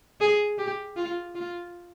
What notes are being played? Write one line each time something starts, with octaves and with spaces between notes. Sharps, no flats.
G#4
G4
F4
F4